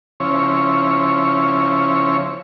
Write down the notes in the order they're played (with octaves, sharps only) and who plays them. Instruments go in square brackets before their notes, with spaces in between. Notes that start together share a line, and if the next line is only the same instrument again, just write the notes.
[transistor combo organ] C#3 F3 C4 C#4 E4 C#5